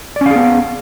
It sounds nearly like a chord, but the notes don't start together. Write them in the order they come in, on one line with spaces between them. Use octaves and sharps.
D5 C#4 F5 G#4 B3